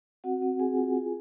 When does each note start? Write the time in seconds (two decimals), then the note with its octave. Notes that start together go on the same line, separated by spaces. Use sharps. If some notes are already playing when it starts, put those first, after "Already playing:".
0.24 C4 F#4 F#5
0.42 C4
0.59 C4 G#4 G#5
0.77 F4
0.95 F4